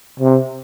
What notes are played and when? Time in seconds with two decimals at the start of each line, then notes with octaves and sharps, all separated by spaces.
0.20 C3